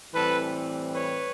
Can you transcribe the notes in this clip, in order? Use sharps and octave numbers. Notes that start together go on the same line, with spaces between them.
A2 E3 G3 C4 A4 B4
B4 C#5